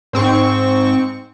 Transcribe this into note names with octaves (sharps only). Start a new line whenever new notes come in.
G#2 C4 C#6